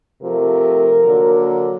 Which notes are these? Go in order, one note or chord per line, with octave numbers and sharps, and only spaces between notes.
C3 F3 A3 A#4
D3 F#3 A#3